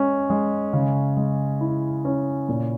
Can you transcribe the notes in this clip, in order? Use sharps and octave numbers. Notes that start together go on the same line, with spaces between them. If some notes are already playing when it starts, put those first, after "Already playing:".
Already playing: G#3 C#4
G#3
C#3
G#3
E4
C#4
A#2